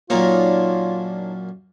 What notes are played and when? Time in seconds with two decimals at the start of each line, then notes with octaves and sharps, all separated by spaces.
0.10 F#2 A#2 A#3 D4 D#4 F4 C#5